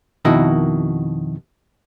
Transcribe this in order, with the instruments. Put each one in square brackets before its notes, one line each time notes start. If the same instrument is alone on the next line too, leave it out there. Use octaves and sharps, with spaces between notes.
[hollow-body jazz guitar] F2 B2 D#3 E4 F#4 A#4